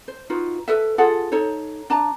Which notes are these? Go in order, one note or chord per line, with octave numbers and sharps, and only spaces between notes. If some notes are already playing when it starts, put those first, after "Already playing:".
C5
D#4 F4 F#4 B4
A4 B4 E5
F4 G#4 A4 F#5
D#4 A4 C#5
D4 A5 A#5